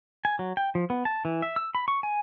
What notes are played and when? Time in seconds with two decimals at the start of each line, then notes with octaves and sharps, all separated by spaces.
0.25 G#5
0.39 F#3
0.57 G5
0.75 F3
0.90 B3
1.05 A5
1.25 E3
1.42 E5
1.56 E6
1.75 B5
1.88 C#6
2.03 G#5